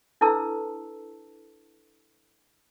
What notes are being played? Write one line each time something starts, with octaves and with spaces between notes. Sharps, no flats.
D4 E4 A4 B4 A5 E6